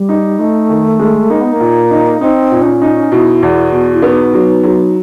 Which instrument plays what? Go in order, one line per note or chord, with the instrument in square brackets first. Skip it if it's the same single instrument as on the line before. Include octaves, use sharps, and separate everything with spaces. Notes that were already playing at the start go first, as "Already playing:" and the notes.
Already playing: [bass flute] G3
[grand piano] D#4
[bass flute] A3 [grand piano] D#4
[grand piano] D#3
G#3
[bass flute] A#3 [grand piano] D#4
[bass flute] B3
A#3
[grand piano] A#2
D#4
[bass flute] C4 [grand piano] D#4
[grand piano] A#2
[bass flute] D4
C#4
[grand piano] D#4
[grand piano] B2 [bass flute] E4
[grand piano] E2
B2
[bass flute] E4
[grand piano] B3 [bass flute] D#4
[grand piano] F#3
F#3